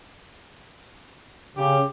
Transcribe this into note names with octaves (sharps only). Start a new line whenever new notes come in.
C#3 G4